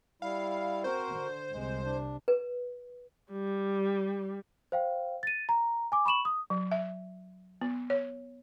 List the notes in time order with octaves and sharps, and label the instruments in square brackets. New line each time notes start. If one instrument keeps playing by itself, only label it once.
[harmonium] G3 E4 [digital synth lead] F5
[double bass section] C4 [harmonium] F#4 A#4 [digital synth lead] C5
[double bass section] D3
[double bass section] C2 C3 [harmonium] G#3
[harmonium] D4
[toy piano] B4
[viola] G3
[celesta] C5 F5 G5
A6 D#7
A#5
G#5 D6
B5 C#6 E7 F#7
D#6
[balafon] F#3
E5
B3
C#5